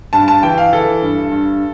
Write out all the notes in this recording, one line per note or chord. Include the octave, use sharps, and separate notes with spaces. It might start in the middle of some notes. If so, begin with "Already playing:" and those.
G2 A5
A5
E3 G5
F5
E3 A4
G2
G2